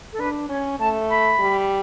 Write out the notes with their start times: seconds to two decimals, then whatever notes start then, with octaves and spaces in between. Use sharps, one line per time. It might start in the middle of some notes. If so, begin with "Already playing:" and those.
0.12 A4
0.19 D4 B4
0.49 C#4 C#5
0.79 A3 A5
1.10 B5
1.39 G3